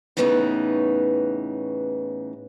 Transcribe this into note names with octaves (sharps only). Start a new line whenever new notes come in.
A2 C#3 E3 B3 D4 D#4